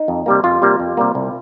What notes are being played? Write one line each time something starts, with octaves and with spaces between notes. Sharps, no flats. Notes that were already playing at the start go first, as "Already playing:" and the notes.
Already playing: D#4
F2
C3 G3 A#3
F2 F4
C3 G3 A#3
F2
C3 G3 A#3
C2